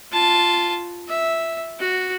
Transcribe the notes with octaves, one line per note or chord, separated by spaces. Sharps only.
F4 A5
E5
F#4